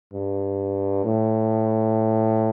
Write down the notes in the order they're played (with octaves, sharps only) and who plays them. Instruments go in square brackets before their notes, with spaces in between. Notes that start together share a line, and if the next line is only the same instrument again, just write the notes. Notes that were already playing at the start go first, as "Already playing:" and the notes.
[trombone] G2
A2